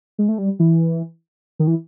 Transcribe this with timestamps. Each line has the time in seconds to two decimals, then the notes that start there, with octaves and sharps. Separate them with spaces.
0.18 G#3
0.28 A3
0.38 G3
0.59 E3
1.59 D#3
1.67 E3